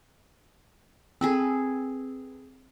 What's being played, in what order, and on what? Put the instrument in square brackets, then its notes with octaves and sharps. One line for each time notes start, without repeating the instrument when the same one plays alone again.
[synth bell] C4 [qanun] G#4 A4 B4